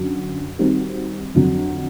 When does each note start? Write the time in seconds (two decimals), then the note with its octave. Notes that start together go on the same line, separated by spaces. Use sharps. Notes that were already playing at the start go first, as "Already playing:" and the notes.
Already playing: F#2 D3 F#3
0.59 D#3 G3 C4 D#4 F#4
1.34 F2 D3 F#3